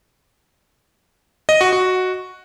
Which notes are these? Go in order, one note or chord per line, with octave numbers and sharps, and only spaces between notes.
D#5
F#4
F#4